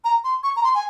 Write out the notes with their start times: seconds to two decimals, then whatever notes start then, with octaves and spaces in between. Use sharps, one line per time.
0.04 A#5
0.24 C6
0.43 C#6
0.56 A#5
0.64 C6
0.75 G#5